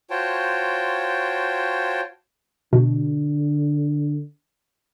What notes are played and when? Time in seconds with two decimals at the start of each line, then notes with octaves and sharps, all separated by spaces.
0.10 F4 F#4 C5 C#5 G5 A5
2.73 B2 D3